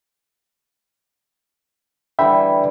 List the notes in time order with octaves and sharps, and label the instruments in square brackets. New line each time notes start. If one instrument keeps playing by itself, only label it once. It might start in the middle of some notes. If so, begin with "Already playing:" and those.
[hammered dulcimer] D3 E3 G3 [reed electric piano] E5 G5 B5